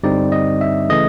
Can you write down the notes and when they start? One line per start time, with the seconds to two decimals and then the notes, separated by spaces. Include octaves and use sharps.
0.04 G2 D3 G3 C4 D#4 D5
0.32 D#5
0.61 E5
0.89 C#3 E3 A3 D#5